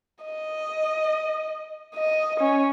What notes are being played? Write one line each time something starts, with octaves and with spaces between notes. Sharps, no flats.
D#5
D#5
C#4